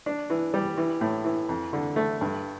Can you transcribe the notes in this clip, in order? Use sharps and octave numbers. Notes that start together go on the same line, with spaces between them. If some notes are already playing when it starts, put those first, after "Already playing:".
D4
E3
G3
E3
A2
E3
F2
D3
A3
G2